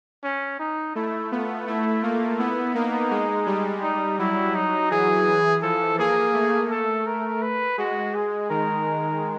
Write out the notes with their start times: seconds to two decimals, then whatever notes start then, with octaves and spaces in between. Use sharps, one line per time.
0.23 C#4
0.59 D#4
0.95 A3 E4
1.31 B3 F4
1.67 A3 E4
2.03 A#3 F4
2.39 B3 E4
2.75 A#3 D#4
3.11 G#3
3.47 G3
3.82 D#4
4.19 F#3 E4
4.55 D#4
4.91 E3 G#4
5.62 F3 A4
5.98 A#3 G#4
6.34 A3
6.71 A4
7.07 A#4
7.42 B4
7.78 G#3 F#4
8.14 G#4
8.50 D#3 A#4